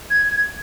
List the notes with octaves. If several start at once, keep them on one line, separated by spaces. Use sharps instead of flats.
G#6